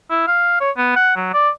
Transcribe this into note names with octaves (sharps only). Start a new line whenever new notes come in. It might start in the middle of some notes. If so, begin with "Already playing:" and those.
E4
F5
C#5
B3
F#5
F#3
D5